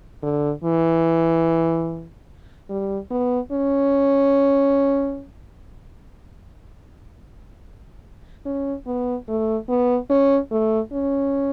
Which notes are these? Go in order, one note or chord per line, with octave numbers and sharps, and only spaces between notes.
D3
E3
G3
B3
C#4
C#4
B3
A3
B3
C#4
A3
C#4